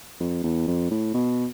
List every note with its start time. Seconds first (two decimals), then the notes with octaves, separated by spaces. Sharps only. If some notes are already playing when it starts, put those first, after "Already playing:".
0.20 F2
0.44 E2
0.68 F2
0.91 A2
1.14 B2